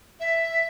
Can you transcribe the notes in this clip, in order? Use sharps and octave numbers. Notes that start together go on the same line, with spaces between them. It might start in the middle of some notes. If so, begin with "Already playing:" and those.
E5